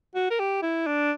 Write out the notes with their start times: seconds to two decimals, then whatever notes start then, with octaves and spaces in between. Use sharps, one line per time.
0.15 F#4
0.30 A#4
0.39 G4
0.62 E4
0.87 D4